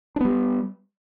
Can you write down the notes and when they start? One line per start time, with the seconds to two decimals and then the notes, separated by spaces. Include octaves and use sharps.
0.16 D4
0.20 B3
0.25 G3